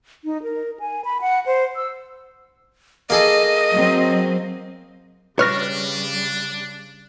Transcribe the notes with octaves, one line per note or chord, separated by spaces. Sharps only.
D#4
A#4
G#5
B5
F#5
C5
E6
A#3 G#4 A4 D#5
F#3 C4
C#3 G3 D4 B4 C#5 F6 A#6